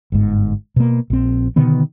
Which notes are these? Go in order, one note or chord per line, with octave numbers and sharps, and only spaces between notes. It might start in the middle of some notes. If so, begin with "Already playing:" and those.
G1 G#2
B2 A#3
A#1 C4
B2 D3 D#3 B3